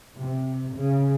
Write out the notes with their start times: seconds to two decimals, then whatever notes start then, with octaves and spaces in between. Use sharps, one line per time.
0.20 C3
0.76 C#3